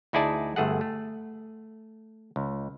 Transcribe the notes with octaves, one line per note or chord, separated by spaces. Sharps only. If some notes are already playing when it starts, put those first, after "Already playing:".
D2 D#4 E4 G#4 D5 A5
G1 A3 G#4 F#5
A3
C#2